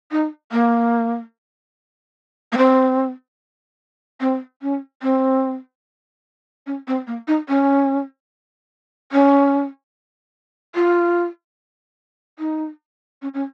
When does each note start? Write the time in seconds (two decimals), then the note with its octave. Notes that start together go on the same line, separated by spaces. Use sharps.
0.12 D#4
0.52 A#3
2.52 A#3
2.57 C4
4.21 C4
4.62 C#4
5.03 C4
6.67 C#4
6.88 C4
7.07 A#3
7.28 D#4
7.49 C#4
9.12 C#4
10.75 F4
12.39 D#4
13.22 C#4
13.34 C#4